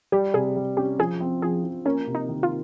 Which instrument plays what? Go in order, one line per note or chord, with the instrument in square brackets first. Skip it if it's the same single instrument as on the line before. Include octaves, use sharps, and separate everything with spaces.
[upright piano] G3 [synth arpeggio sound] G4
[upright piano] C3 [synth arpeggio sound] G#4
[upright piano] G3
[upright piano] C#4 [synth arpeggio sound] G4
[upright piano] F3 [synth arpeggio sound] G#4
[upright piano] C4
[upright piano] F3 [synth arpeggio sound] G#4
[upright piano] F3
[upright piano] A#3 [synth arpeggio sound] C#4
[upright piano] C3
[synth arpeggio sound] D#4
[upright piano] D#3
[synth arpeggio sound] F4